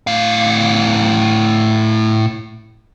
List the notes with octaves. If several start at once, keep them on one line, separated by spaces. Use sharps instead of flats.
A2 F5